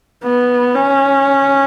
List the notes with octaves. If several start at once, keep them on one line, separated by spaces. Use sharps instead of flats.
B3
C#4